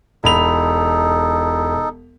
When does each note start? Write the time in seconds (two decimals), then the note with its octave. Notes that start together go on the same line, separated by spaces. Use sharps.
0.24 E1 D#4 A4 B5 F7